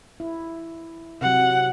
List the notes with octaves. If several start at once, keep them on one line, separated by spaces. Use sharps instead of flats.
E4
C3 F#3 F#5